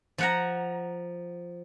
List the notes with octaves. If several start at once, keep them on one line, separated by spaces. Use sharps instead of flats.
F3 F#5 A#5